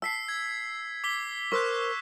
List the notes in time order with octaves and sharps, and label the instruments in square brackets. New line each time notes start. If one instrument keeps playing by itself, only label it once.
[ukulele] A5 [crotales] E6 B6 C7
[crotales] G#6
D6 B6 G7
[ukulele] A#4 C5 [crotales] C#6 E6 F#6